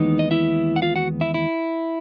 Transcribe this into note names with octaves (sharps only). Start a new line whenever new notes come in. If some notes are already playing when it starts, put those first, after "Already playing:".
Already playing: D#2 E3 G#3 B3 D#4
D#5
E4 E5
F#5
F4 F5
F#4 F#5
E4 E5
E4